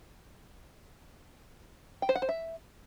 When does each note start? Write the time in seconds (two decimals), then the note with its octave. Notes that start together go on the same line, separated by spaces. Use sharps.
2.02 G5
2.09 C5
2.15 F#5
2.22 C5
2.29 E5